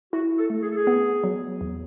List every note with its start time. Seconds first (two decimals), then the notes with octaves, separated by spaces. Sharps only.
0.13 E4 F#4
0.38 A4
0.50 A3
0.62 G#4
0.70 A4
0.76 G#4
0.87 B3
1.24 F#3
1.61 E2